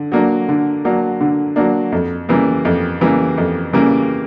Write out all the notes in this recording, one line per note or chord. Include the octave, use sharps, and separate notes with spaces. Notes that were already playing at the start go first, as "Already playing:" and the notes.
Already playing: D3
F#3 A#3 D4
D3
F#3 A#3 D4
D3
F#3 A#3 D4
F2
C#3 E3 G3 A#3
F2
C#3 E3 G3 A#3
F2
C#3 E3 G3 A#3